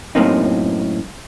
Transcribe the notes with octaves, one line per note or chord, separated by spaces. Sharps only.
F#2 A2 A#3 C4 D#4